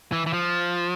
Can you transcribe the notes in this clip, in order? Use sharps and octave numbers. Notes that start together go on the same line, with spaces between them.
E3
E3
F3